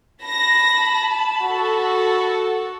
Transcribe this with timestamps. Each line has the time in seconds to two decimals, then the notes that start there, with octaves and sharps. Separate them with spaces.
0.24 A5 B5 A#6
1.43 F#4 A4